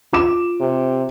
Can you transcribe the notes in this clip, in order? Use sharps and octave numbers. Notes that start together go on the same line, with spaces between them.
F4 D6 E7
C3